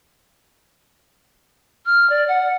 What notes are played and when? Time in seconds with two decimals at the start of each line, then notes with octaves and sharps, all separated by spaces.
1.86 F6
2.10 D5
2.28 F#5